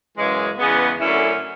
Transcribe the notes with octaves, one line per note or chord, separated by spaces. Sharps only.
F#2 C#3 E3 G#3
E2 C#3 G#3 B3
F#2 D3 A3 C#4 E4